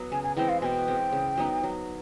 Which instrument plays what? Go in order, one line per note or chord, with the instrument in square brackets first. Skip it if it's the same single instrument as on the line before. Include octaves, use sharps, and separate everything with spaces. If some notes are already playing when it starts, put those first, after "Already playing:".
Already playing: [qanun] F#3 B3
[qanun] C#3 [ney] G#5
[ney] G#5
[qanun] E3 G#3 C4 [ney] G5
[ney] F5
[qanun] B2 [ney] G5 G#5
[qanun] G#3 C4
C#3
F#3 B3 D#4
F#3